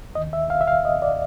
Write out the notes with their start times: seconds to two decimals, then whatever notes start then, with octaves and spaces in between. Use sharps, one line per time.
0.15 D#2 D#3 D#5
0.33 E5
0.50 F5
0.61 E5
0.67 F5
0.85 D#5
1.02 D5